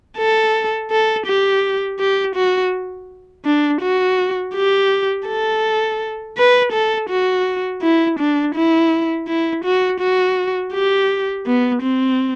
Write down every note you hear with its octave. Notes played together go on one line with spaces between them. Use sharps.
A4
A4
G4
G4
F#4
D4
F#4
G4
A4
B4
A4
F#4
E4
D4
E4
E4
F#4
F#4
G4
B3
C4